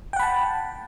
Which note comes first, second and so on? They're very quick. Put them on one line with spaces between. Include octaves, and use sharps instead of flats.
G5 F#5 B5 A5